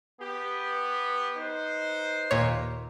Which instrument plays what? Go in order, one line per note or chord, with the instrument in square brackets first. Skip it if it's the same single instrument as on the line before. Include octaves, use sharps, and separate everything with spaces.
[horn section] B3 G4
D#4 B4 C5
[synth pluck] D#2 A#2 C#5